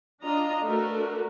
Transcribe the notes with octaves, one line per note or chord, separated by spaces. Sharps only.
D4 F4 D#5 A#5
A3 D4 F#4 A#4 B4